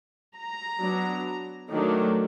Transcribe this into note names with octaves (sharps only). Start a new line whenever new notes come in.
A#5
F#3 B3 D4
D#3 F#3 A3 D4